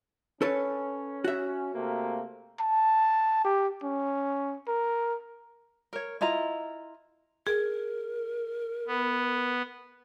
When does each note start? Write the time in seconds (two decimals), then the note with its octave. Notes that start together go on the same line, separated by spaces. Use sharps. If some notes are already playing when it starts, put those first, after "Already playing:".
0.42 C#4 A4 B4 C#5
1.24 F#4 E5
1.73 C3 A3 A#3
2.60 A5
3.45 G4
3.83 C#4
4.68 A#4
5.93 A#4 C#5
6.21 E4 F4 D#5 A#5
7.47 G#4 A#4
8.87 B3